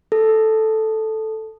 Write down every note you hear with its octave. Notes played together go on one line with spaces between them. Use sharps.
A4